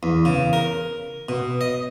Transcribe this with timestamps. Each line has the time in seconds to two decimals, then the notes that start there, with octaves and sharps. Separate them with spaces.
0.03 E2
0.25 C#3
0.53 A#4
1.29 B2
1.61 D#5